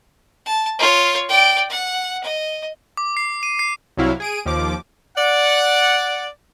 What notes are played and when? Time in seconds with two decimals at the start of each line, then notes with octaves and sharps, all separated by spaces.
0.46 A5
0.79 F4 C#5
1.29 D5 G5
1.70 F#5
2.23 D#5
2.97 D6
3.17 C7
3.43 D#7
3.59 C7
3.97 C2 C3 F#3 E4 F5
4.20 G#4 D7 D#7
4.45 D#2 F3 D6
5.16 D5 F#5